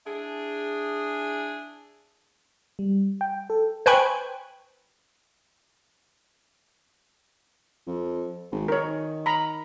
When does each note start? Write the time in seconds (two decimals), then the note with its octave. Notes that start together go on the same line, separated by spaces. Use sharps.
0.06 D4 E4 G#4
2.79 G3
3.21 G5
3.50 A4
3.86 B4 C5 G5 G#5 B5 C#6
7.87 F2
8.51 G#1
8.68 D#3 A#4 C#5
9.26 A#5 B5